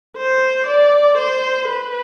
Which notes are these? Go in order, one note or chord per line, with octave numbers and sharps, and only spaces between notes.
C5
D5
C5
B4